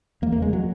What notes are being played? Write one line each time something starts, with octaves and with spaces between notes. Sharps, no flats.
E2 A#3
A#3
C#3 G#3
F#3